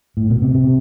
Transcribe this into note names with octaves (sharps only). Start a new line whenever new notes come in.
A2
B2
C3
C3